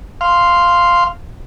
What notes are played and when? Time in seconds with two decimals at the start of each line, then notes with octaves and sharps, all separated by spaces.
0.21 F5 C6